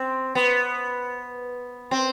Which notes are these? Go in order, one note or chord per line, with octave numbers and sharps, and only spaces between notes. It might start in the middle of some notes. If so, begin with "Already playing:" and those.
Already playing: C4
B3
C4